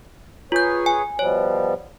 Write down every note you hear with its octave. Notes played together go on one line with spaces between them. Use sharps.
F4 G#4 B4 C#5 G6
G#5
B2 F3 G3 C#5